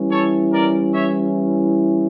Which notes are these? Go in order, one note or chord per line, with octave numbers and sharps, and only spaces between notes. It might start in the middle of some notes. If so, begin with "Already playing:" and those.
Already playing: E3 G3 C#4 E4
A4 C#5
A#4 D5
C#5 E5